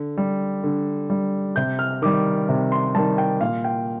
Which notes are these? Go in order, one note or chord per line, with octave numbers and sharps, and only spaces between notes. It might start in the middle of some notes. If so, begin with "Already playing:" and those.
Already playing: D3
G3
D3
G3
C3 G6
F6
D#3 G3 D6
C3
C6
D#3 G3 A5
G5
A#2 F5
G5